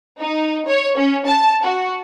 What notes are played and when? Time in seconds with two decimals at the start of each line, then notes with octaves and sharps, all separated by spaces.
0.20 D#4
0.67 C#5
0.97 C#4
1.26 A5
1.64 F#4